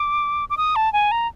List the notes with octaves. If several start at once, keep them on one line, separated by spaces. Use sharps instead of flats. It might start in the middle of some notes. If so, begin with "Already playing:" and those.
Already playing: D6
D6
D#6
A5
G#5
A#5